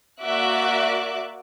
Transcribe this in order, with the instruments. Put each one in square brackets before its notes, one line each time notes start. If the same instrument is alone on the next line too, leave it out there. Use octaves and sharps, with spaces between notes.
[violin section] A#3 F#4 D5 E5 D6 F#6